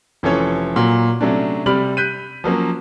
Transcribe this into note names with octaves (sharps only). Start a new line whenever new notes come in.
F1 E3 F3 C#4 A4 C#5
A#2 F#3
C3 F#3 A3 C#4 D4
C3 G3 D5 B5 F6 F#7
F#6 G6 B6 D#7
F3 F#3 A#3 C#4